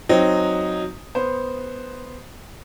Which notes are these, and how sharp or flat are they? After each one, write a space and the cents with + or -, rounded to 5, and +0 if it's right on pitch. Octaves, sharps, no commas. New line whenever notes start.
F#3 -5 C4 +0 D#4 +0
B3 +0 C5 +0